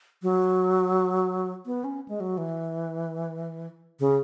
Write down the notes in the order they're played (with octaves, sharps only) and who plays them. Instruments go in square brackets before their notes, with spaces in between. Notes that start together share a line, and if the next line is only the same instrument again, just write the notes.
[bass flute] F#3
B3
C#4
G#3
F#3
E3
C#3